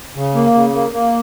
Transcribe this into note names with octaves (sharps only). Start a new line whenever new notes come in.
C#3
A#3
C#3
A#3
A#3